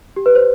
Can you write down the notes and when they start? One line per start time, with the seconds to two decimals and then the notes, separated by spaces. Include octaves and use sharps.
0.16 G4
0.26 B4
0.35 C5